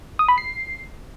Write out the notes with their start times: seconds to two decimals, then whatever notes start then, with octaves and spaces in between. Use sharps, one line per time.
0.19 D#6
0.28 B5
0.38 C7